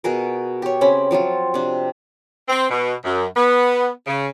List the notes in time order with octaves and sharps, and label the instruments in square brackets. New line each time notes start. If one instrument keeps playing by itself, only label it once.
[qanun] B2 F#4 G#4 A#4
G4 C#5
C#3 C4 C#4 B5
F3 F#3 C4 F4
C3 D4
[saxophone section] C4
B2
F#2
B3
C#3